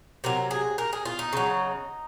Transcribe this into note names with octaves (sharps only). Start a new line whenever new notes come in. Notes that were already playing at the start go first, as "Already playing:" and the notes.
C3 F#3 A#4
G#4
A#4
G#4
F4
D#4
C#3 F#3